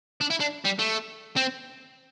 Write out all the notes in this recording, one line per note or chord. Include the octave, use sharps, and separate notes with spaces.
D4
E4
D4
G3
A3
C4